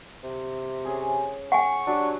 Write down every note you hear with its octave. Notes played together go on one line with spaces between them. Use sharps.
C3
C#4 G#4 G#5
F#5 G#5 C#6
F#3 D4 G4